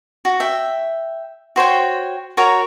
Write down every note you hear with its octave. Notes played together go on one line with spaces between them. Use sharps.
F#4
E5 G5
F#4 C5 C#5 G5
F#4 A#4 C#5